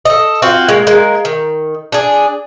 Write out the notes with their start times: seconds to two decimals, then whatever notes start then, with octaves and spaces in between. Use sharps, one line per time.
0.05 A4 D#5
0.42 C4 F4 F#4
0.69 G#3 A#3
0.87 G#3 A#3
1.25 D#3
1.92 D4 G#4